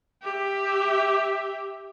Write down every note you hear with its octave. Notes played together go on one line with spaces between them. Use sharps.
G4 E5